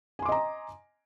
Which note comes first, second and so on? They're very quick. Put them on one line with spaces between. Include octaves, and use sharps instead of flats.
G#5 C6 D6 D#5 A#5